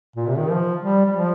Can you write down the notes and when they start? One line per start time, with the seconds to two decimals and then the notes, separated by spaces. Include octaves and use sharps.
0.16 A#2
0.28 C3
0.38 D#3
0.51 F3
0.82 G3
1.06 G3
1.16 F3